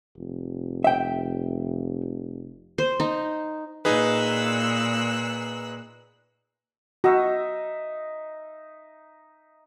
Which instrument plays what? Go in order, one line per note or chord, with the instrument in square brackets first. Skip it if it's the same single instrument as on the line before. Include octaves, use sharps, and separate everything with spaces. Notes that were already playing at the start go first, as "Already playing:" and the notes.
[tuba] F1
[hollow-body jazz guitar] E5 G5
[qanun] C5
D#4
[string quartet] A#2 E6 F#6 [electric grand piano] D#4 G#4 B4
[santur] D#4 E5 [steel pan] F#4